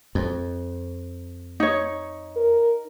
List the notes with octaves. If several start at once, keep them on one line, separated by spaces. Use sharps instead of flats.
F2
D#4 C#5
A#4